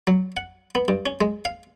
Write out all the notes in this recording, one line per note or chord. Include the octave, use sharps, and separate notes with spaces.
F#3
F#5
B3
G2
C#4
G#3
F5